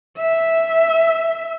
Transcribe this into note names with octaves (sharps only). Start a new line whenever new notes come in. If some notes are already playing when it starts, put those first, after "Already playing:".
E5